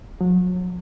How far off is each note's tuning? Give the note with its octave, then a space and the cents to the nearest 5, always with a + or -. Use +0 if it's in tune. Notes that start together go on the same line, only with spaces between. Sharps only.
F#3 -35